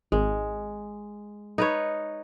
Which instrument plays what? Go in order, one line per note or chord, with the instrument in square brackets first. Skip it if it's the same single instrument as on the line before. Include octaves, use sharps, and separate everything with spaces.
[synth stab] G#1 [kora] G#3
[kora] D#4 B4 C#5